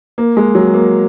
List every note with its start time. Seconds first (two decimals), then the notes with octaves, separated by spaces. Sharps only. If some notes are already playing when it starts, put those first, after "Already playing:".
0.18 A#3
0.37 G#3
0.55 F#3
0.74 A#3